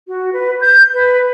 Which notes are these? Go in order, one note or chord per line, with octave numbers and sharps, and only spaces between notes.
F#4
B4
G6
B4